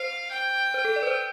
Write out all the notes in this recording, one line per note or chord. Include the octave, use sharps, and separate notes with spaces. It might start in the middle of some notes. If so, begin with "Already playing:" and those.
Already playing: C5 F5
G5
C5
A4
D5
B4
C5